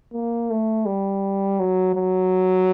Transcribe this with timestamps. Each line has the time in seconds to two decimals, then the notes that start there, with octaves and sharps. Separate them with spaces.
0.14 A#3
0.50 A3
0.86 G3
1.60 F#3
1.96 F#3